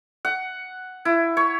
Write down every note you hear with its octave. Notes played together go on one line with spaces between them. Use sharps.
F#5
E4
C#5